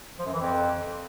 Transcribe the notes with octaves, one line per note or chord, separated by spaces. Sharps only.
F3
F#2
E3
F2